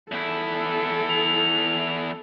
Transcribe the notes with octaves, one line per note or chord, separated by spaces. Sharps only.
E2 E4 A4
F7